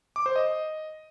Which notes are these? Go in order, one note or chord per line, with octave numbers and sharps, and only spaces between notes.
D6
C5
D#5